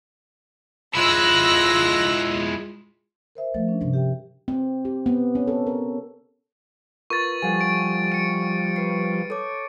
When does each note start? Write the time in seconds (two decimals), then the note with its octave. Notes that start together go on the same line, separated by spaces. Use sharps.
0.95 G#3 E4 F4 E6 F#6 A#6
3.35 A#4 C5 E5
3.54 F3 A3
3.68 C#4 D4
3.81 G2 C3
3.93 G4 E5 G5
4.48 C4
4.85 G4
5.06 B3
5.35 C#4
5.47 A4
5.67 A#4
7.10 F4 A#4 B4 C#6 A6
7.42 F3 G3 A4 F#5 G#5
7.61 D7
8.12 C#7 D7
8.76 B4 C7
9.30 A4 C#5 D6